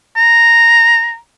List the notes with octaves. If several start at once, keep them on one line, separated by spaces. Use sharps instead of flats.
A#5